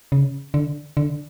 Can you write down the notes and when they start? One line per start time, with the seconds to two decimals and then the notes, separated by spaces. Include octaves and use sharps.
0.12 C#3
0.54 D3
0.97 D3